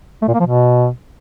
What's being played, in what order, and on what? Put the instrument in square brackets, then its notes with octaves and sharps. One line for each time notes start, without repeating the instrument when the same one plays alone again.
[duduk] A3
A#2
A#3
F3
B2